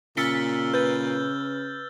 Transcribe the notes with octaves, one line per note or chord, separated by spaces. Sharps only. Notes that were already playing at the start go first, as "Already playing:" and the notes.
A#2 C#3 E6 F6 A6 B6 C#7 G7
B4 G6 A6